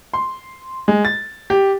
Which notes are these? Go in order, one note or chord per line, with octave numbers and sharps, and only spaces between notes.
C6
G#3
A6
G4